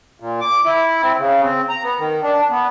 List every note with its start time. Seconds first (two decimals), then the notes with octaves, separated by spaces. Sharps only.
0.20 A#2
0.41 D6
0.64 E4
1.02 C4
1.18 C#3
1.43 C4
1.69 A#5
1.83 B3
1.98 D#3
2.22 D4
2.50 B3